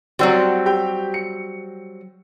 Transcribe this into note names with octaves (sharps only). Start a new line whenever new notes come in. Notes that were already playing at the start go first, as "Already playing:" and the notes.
F#3 G3 C4 F#4 E6
G4 G5
C#7